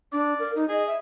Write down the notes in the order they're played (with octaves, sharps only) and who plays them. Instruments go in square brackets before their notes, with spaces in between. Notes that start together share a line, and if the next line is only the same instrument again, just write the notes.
[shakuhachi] D4 [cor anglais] D5
[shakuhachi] A#4
D#4
[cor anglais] G#4 [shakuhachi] D#5
[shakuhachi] E5